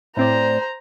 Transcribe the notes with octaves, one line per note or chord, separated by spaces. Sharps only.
A2 C4 C5 D5 A#5